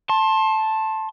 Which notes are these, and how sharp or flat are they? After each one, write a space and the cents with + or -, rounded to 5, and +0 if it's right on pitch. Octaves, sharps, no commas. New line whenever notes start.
A5 +0 C6 +30